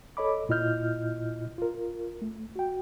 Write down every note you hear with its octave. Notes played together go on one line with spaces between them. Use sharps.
A4 C#5 D#5 B5 D6
A#2 E4 F4 D#5 F6 G6
F4 A#4
A3
F#4 G5